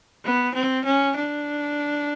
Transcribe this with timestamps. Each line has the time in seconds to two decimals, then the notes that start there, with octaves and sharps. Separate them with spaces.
0.25 B3
0.55 C4
0.85 C#4
1.16 D4